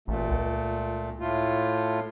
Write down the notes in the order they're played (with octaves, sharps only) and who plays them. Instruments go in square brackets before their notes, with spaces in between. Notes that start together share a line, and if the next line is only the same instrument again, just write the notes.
[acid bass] A1 [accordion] A#2 A3
[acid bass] C#2
[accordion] A2 A3 F4